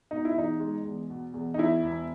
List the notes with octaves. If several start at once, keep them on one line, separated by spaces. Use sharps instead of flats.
B2 D#4
E4
E2 D#4
G#3
E2
B2
E2
D#4
E2 E4
E1